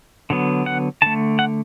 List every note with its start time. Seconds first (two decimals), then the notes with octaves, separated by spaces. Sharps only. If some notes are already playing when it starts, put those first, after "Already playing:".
0.30 D3 F#3 B3
0.66 F#5
1.02 D3 A3 A5
1.39 F#5